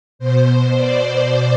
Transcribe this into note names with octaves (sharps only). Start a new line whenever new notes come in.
B2 C5
D5